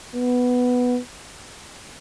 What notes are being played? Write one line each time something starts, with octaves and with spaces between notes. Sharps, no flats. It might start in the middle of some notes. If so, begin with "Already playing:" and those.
B3